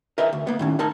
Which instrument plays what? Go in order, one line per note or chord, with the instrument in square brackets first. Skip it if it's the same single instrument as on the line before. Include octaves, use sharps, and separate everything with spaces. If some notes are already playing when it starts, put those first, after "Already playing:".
[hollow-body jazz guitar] A#4 B4 D#5 E5
D2
A#3 B3
A2 D#3 C#4
D#4 A#4 A5